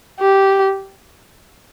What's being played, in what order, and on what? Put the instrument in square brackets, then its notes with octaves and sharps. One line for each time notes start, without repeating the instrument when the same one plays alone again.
[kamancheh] G4